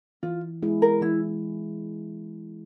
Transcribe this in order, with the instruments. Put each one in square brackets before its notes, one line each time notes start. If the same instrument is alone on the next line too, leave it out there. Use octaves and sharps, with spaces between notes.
[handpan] E3 [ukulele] F4
[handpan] G#3 B3 E4 G#4
[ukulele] A#4
[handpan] E3 [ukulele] E4